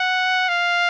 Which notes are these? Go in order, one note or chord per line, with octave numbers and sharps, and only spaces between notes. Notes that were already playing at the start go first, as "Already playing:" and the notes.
Already playing: F#5
F5